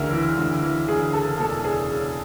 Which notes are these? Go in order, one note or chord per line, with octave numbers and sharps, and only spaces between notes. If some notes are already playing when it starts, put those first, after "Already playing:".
Already playing: D2 C#3 E3 A#4 E5
E3
D2
E3
D2 G#4
C#3 A4
E1 A4
C#3 G#4
C#3